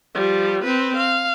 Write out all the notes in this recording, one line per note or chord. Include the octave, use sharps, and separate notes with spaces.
F3 G3
C4 B4
F5